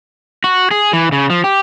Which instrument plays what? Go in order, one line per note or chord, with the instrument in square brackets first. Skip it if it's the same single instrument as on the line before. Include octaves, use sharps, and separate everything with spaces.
[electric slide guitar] F#4
G#4
E3
C#3
F3
G4